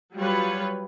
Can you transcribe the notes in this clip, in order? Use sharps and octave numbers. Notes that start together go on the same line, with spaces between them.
F#3 G3 F4 B4 C#5